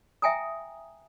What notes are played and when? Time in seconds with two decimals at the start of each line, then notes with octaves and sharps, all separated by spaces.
0.22 E5 G5 G#5 A#5 D#6